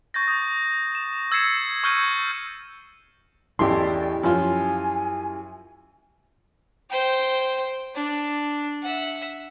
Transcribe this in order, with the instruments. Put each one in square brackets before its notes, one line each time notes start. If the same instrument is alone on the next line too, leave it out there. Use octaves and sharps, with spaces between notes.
[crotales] C#6 G6 A6 A#6
D#6 G6
E7
E6 G#6 A6 C7 C#7 E7
C#6 E6 F6 G6 C#7 D#7
[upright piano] A1 E2 A4 [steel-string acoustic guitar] E4 G4 [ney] D5 [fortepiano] C6
[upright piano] F#2 C#5 C6 [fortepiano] F3 F4 [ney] G#5
[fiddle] C5 G5
D4
E5 F#5